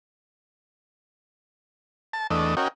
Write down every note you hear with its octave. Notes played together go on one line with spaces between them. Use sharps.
A5
E2 A3 D4 D#5
C#4 F#4 A#4 D#5 G5